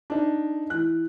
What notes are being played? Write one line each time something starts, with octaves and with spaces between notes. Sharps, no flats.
D4 D#4
E3 F#6